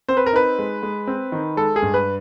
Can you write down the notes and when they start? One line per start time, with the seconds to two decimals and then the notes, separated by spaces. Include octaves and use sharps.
0.08 C4 C5
0.17 B4
0.26 A#4
0.33 D#4 B4
0.59 G#3
0.83 G#3
1.07 C4
1.32 D#3
1.57 G#3 A4
1.76 G#4
1.82 G2
1.94 B4